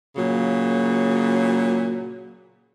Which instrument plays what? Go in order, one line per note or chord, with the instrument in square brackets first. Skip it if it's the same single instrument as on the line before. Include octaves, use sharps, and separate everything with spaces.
[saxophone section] A#2 C#3 F#3